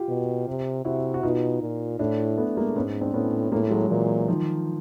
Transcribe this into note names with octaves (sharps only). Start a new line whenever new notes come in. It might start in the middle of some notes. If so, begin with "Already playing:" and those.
Already playing: F4 G4
B2
C3
C3 E4 F#4
F#4
B2 D#4 F4
A#2
A2 D4 E4
A3 B3
G#3 A#3
G#2 B3 C#4
C4 D4
A2 B3 C#4
A2 G#3 A#3
F#3 G#3
A#2 E3 F#3
D#3 F3